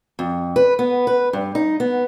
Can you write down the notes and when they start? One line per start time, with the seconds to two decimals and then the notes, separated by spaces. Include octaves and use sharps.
0.19 F2
0.56 B4
0.79 B3
1.07 B4
1.33 G2
1.55 D#4
1.80 B3